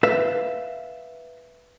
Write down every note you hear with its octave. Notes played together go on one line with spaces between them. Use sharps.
B4 E5 F5